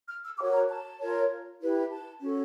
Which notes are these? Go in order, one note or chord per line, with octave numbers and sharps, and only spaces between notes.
F6
E6
F#4 A#4 C#5 D6
A#5
A5
F4 A#4 C#5
E4 G4 B4
A5
C#4 F#4 A4